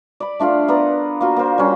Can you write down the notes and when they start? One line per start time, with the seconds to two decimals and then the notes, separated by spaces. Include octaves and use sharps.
0.20 D5 B5
0.39 A3 D4 F4 F5
0.68 B3 A#4 D5 A#5
1.21 A#3 F4 F#4
1.36 A#3 C5
1.58 G3 C#4